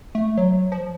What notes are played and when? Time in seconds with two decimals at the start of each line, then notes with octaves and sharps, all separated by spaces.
0.15 A3
0.37 F#3
0.72 F3